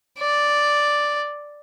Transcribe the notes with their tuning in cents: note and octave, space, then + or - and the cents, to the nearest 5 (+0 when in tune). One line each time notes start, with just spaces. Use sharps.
D5 +0